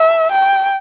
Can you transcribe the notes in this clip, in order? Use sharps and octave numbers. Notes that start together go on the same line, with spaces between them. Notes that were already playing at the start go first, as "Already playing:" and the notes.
Already playing: E5
G5